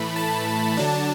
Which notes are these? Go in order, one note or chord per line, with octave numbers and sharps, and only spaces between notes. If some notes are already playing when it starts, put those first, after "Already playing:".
Already playing: A2 E3 A3 B5
A5
D3 F#3 D4